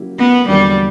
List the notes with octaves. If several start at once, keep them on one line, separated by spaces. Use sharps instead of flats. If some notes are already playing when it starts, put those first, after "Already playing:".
Already playing: C#3 F#3 A#3 E4 G4
B3
E2 D3 F#3 G3 A#3